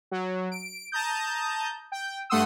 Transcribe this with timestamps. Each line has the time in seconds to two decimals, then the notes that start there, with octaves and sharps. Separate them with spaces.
0.11 F#3
0.51 D7
0.92 A5 A#5 D#6 G6
1.92 G5
2.30 G2 A3 F#5 C6 D#6 E6